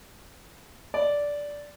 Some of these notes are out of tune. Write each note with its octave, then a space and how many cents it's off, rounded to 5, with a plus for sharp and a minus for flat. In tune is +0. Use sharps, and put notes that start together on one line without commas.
D5 -10